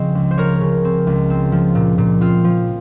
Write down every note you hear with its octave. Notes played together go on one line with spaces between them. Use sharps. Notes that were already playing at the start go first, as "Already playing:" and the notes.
Already playing: C#3 F3 C4 D#5
C#2
C5
F3 A#4 C#5
C#3
C4
C#2
C4
F3
A#2
A#2
C4 F4
F3